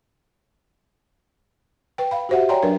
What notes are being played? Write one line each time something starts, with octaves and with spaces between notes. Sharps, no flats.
B4 G5
F5 B5
F#4 G4 C5 E5 F#5
C#5 D5 G5 G#5 A#5 C6
F#3 D4 A#4 B4 D5